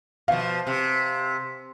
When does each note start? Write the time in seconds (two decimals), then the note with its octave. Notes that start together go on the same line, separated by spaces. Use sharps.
0.28 B2 F3 F5
0.67 C3